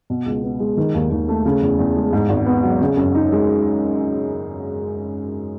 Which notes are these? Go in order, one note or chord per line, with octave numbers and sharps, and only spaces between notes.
B2
C#2
B3
G#3
D#3
D#2
D#2
A3
C#3
E2
E2
G#3
G#2
G#1
B3
F#3
C#3
F#2
D#4
G#3